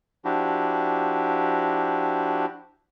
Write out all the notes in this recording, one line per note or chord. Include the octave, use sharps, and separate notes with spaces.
F3 D4 E4 F#4 G4